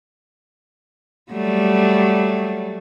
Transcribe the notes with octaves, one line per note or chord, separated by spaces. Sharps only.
F#3 G3 A3